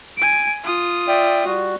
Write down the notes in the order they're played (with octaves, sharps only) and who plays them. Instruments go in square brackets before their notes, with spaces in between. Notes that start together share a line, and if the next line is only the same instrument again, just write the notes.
[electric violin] G#5 D7
F4 D#6
[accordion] D5 E5 G5
G3 F#4